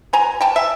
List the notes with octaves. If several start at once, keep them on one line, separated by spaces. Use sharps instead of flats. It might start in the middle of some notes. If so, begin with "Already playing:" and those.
B2 G#5 A#5
B3 G5 A5
E5